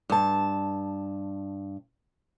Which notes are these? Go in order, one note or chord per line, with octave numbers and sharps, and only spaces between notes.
G2 A5